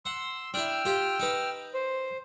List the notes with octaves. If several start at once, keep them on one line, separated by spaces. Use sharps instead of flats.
F#5 C6 E6
D4 E4 G5 E6 F6
F4 G4
D#4 B4
C5